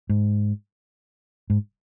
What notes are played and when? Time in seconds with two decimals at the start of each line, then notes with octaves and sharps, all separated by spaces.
0.09 G#2
1.50 G#2